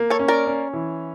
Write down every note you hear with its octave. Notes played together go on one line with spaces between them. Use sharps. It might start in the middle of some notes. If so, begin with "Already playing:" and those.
Already playing: A#3
A4 C#5
C#4
A#4 D5
C#4
E3